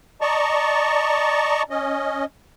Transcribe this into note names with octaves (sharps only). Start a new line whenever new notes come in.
D5 D#5 A5 A#5 C#6
C#4 D#5